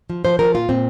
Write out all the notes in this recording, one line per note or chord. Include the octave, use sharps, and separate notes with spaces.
F3
F3 C5
F3 A#4
A#2 F4
A#2 C4